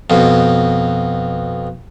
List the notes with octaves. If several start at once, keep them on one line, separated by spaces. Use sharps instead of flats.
F2 B2